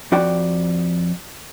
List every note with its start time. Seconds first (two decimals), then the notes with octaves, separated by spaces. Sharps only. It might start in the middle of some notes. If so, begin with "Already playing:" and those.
0.12 F2 F#4 D5 G5